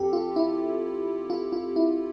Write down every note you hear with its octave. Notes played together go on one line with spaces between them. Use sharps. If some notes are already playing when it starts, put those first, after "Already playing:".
Already playing: F2 C4 G4 A4
F4
E4
F4
F4
E4